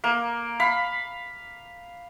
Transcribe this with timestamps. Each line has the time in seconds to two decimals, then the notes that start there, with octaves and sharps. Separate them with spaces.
0.04 A#3
0.60 F5 B5